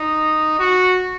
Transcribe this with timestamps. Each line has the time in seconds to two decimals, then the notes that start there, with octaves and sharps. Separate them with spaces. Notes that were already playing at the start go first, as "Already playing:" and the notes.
Already playing: D#4
0.59 F#4